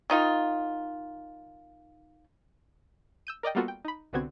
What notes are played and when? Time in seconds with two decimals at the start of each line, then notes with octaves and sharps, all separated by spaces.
0.10 D#3 D#4 F4
3.27 E6 G6 D#7
3.43 A#4 D5 D#5 G5
3.55 G3 A#3 B3 F4 F#4 A4
3.68 G5
3.85 D#4 B5
4.13 C2 D3 B3 C4 F#4 G#6